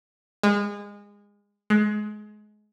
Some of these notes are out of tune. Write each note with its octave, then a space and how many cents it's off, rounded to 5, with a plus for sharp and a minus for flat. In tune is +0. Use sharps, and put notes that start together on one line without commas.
G#3 -25
G#3 +25